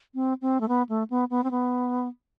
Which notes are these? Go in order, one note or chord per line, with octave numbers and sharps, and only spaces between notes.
C4
C4
A3
B3
A3
B3
B3
C4
B3